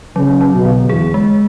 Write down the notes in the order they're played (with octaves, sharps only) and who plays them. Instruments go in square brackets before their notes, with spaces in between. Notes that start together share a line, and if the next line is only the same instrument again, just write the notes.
[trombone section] C#3 [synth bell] F#3
[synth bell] F#3
[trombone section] B2
[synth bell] D3
[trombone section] E2 [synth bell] G#4
[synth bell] G#3